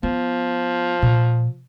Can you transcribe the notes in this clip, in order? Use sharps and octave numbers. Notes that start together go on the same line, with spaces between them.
F3 B3
A#2